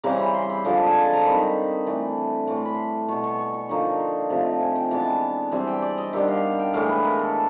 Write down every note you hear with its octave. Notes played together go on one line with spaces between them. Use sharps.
C#3 E3 G3 C4 A#5
B5
C6
B5
D3 F3 G#3
G#5
A5
A#5
D#3 G3 C4 D#4 B5
E3 A3 D4
A2 E3 A3 C#6
C6
B5
C6
B2 G3 B3 C#6
C#6
C#6
C#6
D3 F3 A#3 D#4 C#6
C6
C3 F3 A3
G#5
G5
E3 G#3 B3 D4 A5
E3 G3 C4 G#5
G5
D5
D#5
D#3 G3 B3 D4 E5
F5
G5
A2 E3 G#3 F5
B4
A#4
A4